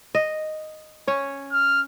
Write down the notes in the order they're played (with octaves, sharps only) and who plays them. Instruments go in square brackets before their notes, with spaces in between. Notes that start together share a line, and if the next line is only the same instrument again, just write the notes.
[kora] D#5
C#4 C#5
[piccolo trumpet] F6